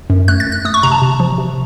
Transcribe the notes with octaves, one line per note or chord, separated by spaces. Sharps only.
F#2
A3 F#6
A6
F#2
F#6
A3 D#6
C#6
C3 A#5
A5
C3
F3
C3